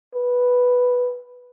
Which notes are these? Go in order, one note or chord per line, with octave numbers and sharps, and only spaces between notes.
B4